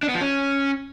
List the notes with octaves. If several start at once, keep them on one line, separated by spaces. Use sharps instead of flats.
D4
B3
F3
C#4